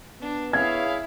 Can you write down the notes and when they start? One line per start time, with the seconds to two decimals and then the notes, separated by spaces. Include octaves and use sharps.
0.21 B3 D4
0.53 E4 G#4 C#5 F5 G#6